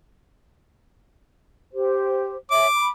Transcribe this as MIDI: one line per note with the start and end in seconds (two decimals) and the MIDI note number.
1.72 2.37 67
1.72 2.37 72
2.51 2.66 68
2.51 2.66 73
2.51 2.66 76
2.51 2.89 86
2.76 2.89 83